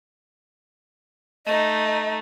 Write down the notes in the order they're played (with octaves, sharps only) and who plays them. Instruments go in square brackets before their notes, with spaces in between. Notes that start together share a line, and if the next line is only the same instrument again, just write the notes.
[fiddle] A3 D#4 [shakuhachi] D#5